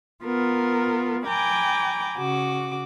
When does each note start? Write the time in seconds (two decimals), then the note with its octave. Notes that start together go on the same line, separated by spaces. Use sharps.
0.23 B3 F4 A#4
1.24 G5 G#5 A#5 B5 D6
2.17 C#3 F#4 D6